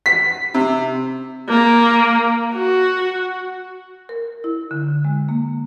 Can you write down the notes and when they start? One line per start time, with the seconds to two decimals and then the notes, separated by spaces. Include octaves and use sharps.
0.06 B6
0.54 C3
1.49 A#3
2.54 F#4
4.09 A#4
4.44 E4
4.71 D3
5.05 G#3
5.29 A#3